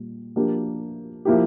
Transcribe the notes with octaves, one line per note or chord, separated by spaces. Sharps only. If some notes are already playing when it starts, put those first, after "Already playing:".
Already playing: A#2 G3
F3 A#3 D4 G4
F3 A#3 E4 G4